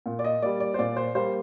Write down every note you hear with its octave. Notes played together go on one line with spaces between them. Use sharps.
A#2
D5
D#5
G3 A#3 D5
D5
C5
A#2 D5
C5
G3 A#3 C5